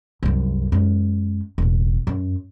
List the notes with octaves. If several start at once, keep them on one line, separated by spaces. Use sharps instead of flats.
C2 F#2
F#2 G#3
E1 A2
F#2